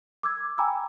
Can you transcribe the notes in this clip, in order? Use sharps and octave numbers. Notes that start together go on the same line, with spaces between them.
D6 E6 G#6
G5 G#5 A#5 B5 D6 E6